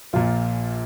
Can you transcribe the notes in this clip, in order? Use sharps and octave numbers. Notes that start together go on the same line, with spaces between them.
A#1 A#2 F4